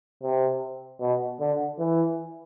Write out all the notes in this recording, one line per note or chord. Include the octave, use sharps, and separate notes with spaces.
C3
B2
D3
E3